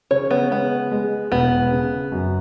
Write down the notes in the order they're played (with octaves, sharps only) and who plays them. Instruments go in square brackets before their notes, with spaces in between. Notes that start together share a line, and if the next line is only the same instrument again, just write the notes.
[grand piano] C#3 [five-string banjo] C#5
[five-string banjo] B3
[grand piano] G#3 [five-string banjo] B3
[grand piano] G#3
[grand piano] E1 [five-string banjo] B3
[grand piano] C#3
F#2